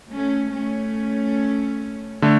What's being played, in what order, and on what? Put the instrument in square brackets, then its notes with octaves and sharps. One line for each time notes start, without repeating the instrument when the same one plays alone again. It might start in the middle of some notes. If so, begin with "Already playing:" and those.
[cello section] A3 C#4
A3 C#4
[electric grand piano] D3 A3